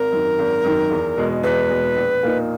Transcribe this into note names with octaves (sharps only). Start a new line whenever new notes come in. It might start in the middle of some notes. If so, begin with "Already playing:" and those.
Already playing: G#1 A#4
F#2 D#3
G#1
F#2 D#3
E2
B2 G#3
E2 B4
B2 G#3
A#1
A#2 A#3 D#4